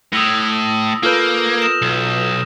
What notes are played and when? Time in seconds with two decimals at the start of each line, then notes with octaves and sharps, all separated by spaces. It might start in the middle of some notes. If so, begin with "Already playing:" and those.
0.13 A2 D#6 E6 A#6
1.03 A#3 F4 A4 B4 E6 F6 G6
1.62 D#6 A#6 E7
1.82 B1